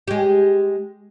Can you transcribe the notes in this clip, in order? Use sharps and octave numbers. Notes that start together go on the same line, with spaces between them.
G#3 G4